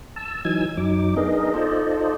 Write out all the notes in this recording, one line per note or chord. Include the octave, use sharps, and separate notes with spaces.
A5 E6
E3 F#3 D#4 G#5 E6 G#6
F#2 F#3 D#4 D6
B3 D4 D#4 G#4 A#4 D#5
D#4 F4 A4 C5 D5 D#5